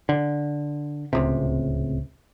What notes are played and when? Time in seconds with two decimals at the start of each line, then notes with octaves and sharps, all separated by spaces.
0.09 D3
1.13 D1 C#2 C3